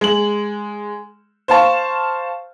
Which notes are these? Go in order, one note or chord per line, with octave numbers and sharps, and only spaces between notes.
G#3 F#7
C5 F5 A5 C#6